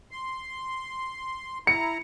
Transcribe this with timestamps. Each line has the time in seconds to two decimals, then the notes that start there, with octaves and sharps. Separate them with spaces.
0.11 C6
1.67 E4 A#5 C#7